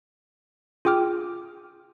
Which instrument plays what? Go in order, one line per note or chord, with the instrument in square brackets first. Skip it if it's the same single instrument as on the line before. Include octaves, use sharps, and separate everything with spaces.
[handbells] F4 G#4 G5 D6 F6